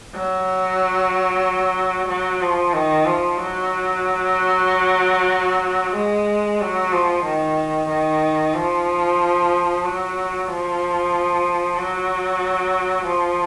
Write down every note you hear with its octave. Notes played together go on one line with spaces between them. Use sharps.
F#3
F#3
F3
D#3
F3
F#3
G#3
F#3
F3
D#3
D#3
F3
F#3
F3
F#3
F3